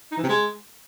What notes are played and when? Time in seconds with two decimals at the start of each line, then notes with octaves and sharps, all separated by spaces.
0.11 D#4
0.17 E3
0.23 C3
0.29 G#3